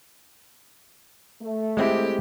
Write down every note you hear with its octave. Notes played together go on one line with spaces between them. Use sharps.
A3
G#3 C4 E4 G4